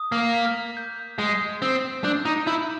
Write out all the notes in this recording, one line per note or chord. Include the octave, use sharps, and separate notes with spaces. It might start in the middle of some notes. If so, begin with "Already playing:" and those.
Already playing: D#6
A#3
B6
G6
G#3 D#6
C4 D#6
D4 G6
D#4
E4 G6